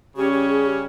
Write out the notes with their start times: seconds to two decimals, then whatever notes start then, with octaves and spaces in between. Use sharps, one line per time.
0.17 C#3 G3 C#4 G4
0.33 G4
0.50 G#4
0.66 G4